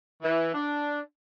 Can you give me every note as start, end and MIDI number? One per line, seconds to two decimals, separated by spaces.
0.23 0.52 52
0.55 1.00 62